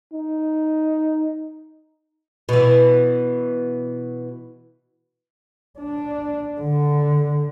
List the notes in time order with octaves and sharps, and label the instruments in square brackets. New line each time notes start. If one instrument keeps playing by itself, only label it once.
[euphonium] D#4
[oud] B2 E3
[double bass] D4
D3